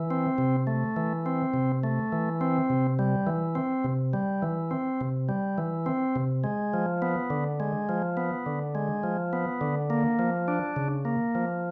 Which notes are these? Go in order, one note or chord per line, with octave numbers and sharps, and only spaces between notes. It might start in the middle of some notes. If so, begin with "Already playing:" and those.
Already playing: E3
C4
C3
A3
E3
C4
C3
A3
E3
C4
C3
G3
E3
C4
C3
G3
E3
C4
C3
G3
E3
C4
C3
G#3
F3
B3
D3
G#3
F3
B3
D3
G#3
F3
B3
D3
A#3
F3
D4
C#3
A#3
F3